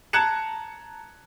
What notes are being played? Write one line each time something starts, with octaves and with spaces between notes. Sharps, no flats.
A5 A#5 F#6 G#6 C#7 E7